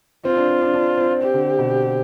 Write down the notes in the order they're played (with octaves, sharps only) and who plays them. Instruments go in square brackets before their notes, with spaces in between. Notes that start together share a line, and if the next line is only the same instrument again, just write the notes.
[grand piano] C4 [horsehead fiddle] F4
[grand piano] D4
C4
D4
D4
C4
[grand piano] C4 [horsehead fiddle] G4
[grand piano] D3
B2